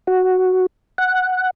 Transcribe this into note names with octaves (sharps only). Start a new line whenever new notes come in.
F#4
F#5